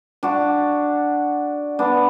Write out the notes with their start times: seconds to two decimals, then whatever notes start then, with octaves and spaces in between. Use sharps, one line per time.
0.23 D4 F#4
1.79 B3 D4